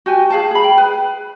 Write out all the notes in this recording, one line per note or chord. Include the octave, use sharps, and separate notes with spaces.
F#4 G4 G#5
G#4 F5 A5
G#4 B5
G5
B4